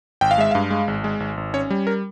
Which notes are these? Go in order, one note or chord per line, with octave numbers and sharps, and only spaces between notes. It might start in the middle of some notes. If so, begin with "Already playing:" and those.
G#1 G5
F5
G#3 E5
G2 F5
G#3
G#1
G#3
G#1
G#1
C#4 C#5
G3
A#4